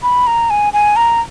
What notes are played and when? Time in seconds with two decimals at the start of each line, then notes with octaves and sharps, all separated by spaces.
0.03 B5
0.27 A#5
0.50 G#5
0.73 G#5
0.96 A#5